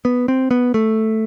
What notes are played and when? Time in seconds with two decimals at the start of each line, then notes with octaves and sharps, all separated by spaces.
0.05 B3
0.28 C4
0.51 B3
0.74 A3